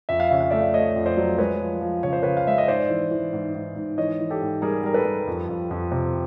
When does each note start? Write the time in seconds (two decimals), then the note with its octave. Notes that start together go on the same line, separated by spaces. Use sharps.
0.09 F2 E5
0.20 F5
0.29 C#3 E5
0.41 F5
0.51 A3 D5 E5
0.74 A3 C#5 D#5
0.96 F2
1.06 C5 D5
1.17 F#3
1.38 G#3 B4 C#5
1.61 F3
1.81 F3
2.03 C#3 C#5
2.13 C5
2.23 C#3 B4 C#5
2.37 F5
2.46 G#3 E5
2.58 D#5
2.68 G#2 C5 D5
2.90 E3
3.11 E3
3.33 G#2
3.54 G#2
3.76 G#2
3.98 E3 C#5 D#5
4.20 E3
4.30 G4 A4
4.42 G#2
4.62 G3 G#4 A#4
4.84 G3 A#4
4.94 A4 B4
5.05 G3
5.27 F2
5.49 F2
5.71 F2
5.92 C3